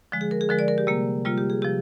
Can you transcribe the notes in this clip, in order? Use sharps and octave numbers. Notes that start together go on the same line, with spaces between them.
D3 F3 G#3
G#4
A#4
G#4
D3 F3 G#3 A#4
D5
A#4
G4
C3 G3 A#3
C3 G3 A#3 F4
G4
G#4
C3 F3 G4